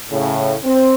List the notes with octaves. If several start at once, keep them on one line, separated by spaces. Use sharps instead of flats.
A2 C#3
C4